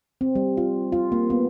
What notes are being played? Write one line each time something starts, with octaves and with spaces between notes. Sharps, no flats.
C4
G3
F4
F4
A#3
B3